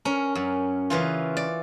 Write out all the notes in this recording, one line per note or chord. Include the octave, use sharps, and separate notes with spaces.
C#4 A#4
F#2
C#3 E3 F4
D5